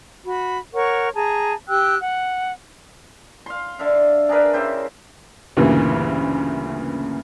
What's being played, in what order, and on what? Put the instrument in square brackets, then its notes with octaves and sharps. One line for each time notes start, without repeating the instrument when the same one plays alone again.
[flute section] F#4 B5
A#4 C#5 F#5 C#6
G#4 A5 A#5
G4 G5 E6 F#6
F#5
[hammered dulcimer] F5 C6
D3 E5 F5
D4 G#4 A#4 B4
C#3 E4 G4 C5
[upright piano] D2 G2 A#2 C#3 E3 A#3